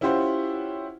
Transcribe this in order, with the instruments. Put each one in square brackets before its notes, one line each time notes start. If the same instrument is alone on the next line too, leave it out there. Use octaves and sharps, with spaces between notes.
[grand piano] C#4 E4 F4 G4 C5 F#5